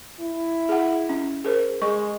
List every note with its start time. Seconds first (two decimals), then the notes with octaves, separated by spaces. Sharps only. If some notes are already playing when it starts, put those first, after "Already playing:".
0.20 E4
0.69 G#4 F#5
1.09 C#4
1.44 G#4 A#4 C5
1.82 G#3 C#6